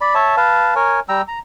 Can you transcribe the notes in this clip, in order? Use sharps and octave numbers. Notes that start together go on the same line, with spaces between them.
D5 B5
C#5 E5 A5
B4 F5 A5
A#4 C#5 G#5
G3 G5 A#5 E6
A#5